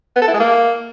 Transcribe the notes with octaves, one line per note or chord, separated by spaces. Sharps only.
B3
A4
E4
G#3
A#3